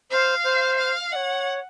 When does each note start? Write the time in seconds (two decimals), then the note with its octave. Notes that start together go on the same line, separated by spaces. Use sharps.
0.11 C5 F5
0.44 C5
0.78 F5
1.12 C#5 D#5 F#5